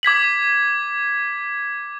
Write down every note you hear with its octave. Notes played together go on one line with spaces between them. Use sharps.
D6 G#6 B6 F#7